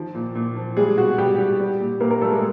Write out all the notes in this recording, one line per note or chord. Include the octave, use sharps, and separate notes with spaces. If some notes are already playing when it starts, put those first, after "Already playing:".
Already playing: D#3 F3
A#2
A#2
F3
G3 G#3 G#4
B2 F#4
B2 G3 G4
G3
G3
A#2
A#2 A#3 A#4
A#3 A#4
G3 A3 A4
G#3 G#4